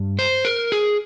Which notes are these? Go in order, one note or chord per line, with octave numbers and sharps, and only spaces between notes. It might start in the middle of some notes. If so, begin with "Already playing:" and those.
Already playing: G2
C5
A#4
G#4